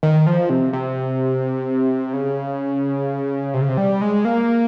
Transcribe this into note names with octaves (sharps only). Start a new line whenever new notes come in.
D#3
F3
C3
C3
C#3
C3
C#3
C3
G3
G#3
A#3